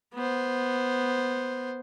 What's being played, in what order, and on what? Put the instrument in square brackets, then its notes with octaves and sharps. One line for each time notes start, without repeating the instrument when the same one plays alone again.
[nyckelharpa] B3 C5